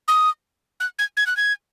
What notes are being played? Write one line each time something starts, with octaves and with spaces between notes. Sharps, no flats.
D#6
F#6
G#6
G#6
F#6
G#6